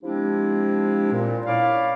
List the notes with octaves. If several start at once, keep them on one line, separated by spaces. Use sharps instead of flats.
F3 G#3 C4 D4 E4 G4
A#2
C#4 E4 D5 F5